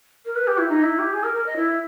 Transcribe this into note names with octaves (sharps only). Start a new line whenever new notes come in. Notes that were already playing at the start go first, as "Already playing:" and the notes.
A#4
B4
G4
E4
D#4
E4
G4
G#4
A#4
A#4
D#5
E4